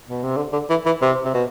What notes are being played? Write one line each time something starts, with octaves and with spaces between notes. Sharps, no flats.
B2
C3
D3
D3
E3
E3
C3
C3
B2